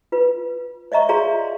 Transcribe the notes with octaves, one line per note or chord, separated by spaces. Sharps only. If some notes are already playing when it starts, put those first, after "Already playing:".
F4 B4
C#5 D#5 E5 A#5 C#6
F4 G#4 D5 F5 A#5 C6